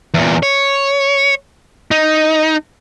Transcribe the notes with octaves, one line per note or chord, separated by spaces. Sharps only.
E2 A#2
C#5
D#4